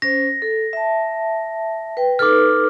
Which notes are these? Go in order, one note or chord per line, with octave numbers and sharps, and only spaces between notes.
C#4 C5 A#6
A4
E5 A5
B4 G5
D#4 A4 B4 D6 F6